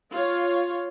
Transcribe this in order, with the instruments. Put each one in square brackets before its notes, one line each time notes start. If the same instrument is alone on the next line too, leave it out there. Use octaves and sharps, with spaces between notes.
[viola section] F4 C#5